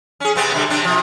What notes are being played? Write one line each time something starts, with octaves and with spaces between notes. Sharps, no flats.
C#4 G#4
C3 B3 C4
B2 D3 G3
C3 C4 D4
B2 F3